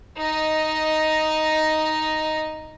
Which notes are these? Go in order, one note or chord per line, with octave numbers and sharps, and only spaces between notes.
D#4 D#5